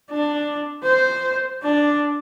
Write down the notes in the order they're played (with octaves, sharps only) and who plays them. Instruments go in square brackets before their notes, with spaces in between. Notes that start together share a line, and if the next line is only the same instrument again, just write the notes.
[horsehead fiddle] D4
C5
D4